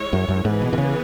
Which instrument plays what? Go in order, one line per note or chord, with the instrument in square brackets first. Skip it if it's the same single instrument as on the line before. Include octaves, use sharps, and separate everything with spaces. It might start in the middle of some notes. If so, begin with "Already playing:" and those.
Already playing: [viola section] G#3 E4 C#5
[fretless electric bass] F#2
F#2
[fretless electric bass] G#2 [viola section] E3 B3 G#4 B4
[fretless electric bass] B2
B2
C#3